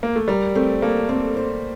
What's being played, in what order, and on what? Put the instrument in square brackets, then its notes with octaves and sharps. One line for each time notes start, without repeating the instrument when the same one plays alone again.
[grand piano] A#3
A3
[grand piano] G3 [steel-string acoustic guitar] A#4
[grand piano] A3 [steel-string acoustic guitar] C4
[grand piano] A#3 [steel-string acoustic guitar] A4
[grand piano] A#3 [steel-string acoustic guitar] C4
[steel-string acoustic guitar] C5